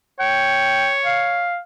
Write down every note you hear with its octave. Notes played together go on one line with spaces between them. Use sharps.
C#5 G5
F5